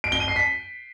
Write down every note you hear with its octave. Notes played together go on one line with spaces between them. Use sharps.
D7
G7
D#7
C7
B6